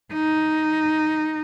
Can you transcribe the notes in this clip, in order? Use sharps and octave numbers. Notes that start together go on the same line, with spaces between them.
D#4